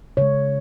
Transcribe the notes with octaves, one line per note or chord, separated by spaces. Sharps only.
C#3 G#3 C#5